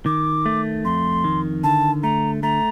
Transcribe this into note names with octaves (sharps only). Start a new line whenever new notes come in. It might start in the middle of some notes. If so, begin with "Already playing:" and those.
D#3 D6
A3
F2 C6
D#3
D3 A5
A3 A#5
A3 A#5